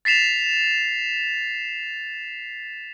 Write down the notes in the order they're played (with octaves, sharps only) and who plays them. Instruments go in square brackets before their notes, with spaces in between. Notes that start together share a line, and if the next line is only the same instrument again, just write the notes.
[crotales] A6 B6 C7 E7 F7